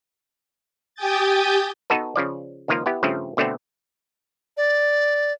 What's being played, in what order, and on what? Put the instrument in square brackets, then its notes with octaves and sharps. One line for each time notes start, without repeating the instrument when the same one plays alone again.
[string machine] G4 G5 G#5 D#6 G6 A6
[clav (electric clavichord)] B3 D#4 F#4 A4 B4
C#3 F3 D5
C#2 D#3 F3 A#3 F4 F5
B3 E4 G4
G2 C#3 F3 A3 C4
B2 D3 A3 B3 C4
[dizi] D5